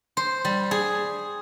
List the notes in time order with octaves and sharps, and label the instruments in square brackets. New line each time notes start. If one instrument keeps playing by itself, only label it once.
[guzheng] C5
G3
G#4